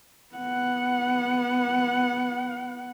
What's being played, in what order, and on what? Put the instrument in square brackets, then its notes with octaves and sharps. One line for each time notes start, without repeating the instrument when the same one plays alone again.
[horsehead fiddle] B3 F#5